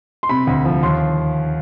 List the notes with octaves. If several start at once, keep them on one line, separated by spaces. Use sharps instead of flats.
C6
C3 B5
D2
F3
D#2 C6